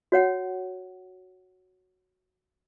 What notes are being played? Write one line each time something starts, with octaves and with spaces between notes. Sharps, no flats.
F#4 C#5 F#5